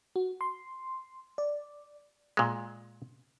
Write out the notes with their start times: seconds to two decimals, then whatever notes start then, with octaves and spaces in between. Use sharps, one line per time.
0.16 F#4
0.41 C6
1.38 D5
2.37 A#2 G#3